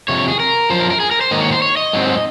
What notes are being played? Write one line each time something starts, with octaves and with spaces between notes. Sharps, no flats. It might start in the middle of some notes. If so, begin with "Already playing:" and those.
F2 C3 C#5
G#4
A#4
F#2 F3 C5
A#4
A#4
G#4
A#4
C5
G#2 D#3 F#3 A#3 D#5
C#5
C5
C#5
D#5
G#2 F#3 C4